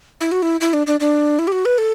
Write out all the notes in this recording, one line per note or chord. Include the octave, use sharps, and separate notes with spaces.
E4
F#4
E4
E4
D4
D4
D4
E4
G4
F#4
B4
A4